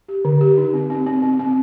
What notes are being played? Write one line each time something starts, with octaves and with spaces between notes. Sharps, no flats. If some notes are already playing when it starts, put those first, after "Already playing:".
G4
D3
G4
D#4
C4
C4
C4
C4
C4